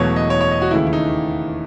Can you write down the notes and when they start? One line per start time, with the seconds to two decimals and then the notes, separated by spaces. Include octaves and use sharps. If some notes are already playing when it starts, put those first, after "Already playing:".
Already playing: E1 E2 B2 F#3 A3 C#5
0.16 D#5
0.30 C#5
0.41 C#5
0.51 D#5
0.62 F#4
0.71 D#2 C#3 E3 A3 E4
0.87 E4
0.93 D#4